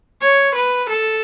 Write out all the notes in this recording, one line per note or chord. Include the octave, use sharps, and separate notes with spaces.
C#5
B4
A4